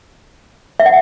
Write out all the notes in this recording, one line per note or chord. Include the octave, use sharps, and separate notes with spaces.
E5
F#5